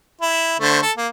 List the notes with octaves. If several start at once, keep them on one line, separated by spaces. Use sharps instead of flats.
E4
D3 A3 C5
A4
A#3